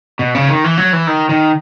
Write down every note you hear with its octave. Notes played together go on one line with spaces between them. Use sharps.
B2
C#3
D#3
E3
F#3
E3
D#3
D#3